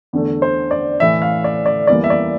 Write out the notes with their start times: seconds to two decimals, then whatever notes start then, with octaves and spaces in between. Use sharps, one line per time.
0.13 E2 D3 A3
0.42 C5
0.71 D5
1.00 A2 E3 A3 E5
1.22 F5
1.44 D5
1.66 D5
1.87 E2 E3 G3 A#3 D5
2.04 E5
2.10 D5